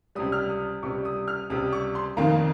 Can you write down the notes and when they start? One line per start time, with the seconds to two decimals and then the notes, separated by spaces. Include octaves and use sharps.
0.15 C#2 C3 G3 D#6
0.32 F6
0.49 D#6
0.83 C#2 C3 G3 C#6
1.05 D#6
1.28 F6
1.50 C#2 C3 G3 D#6
1.73 C#6
1.95 C6
2.17 F1 F2 D#3 A#3 A#5